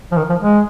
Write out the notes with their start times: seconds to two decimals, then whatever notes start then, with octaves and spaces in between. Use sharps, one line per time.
0.12 F3
0.17 D#3
0.29 F3
0.41 G#3